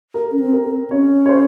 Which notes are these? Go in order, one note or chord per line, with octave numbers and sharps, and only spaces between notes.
A#4
C#4
C4
A#4
C4
C#4 C#5
C#5
C5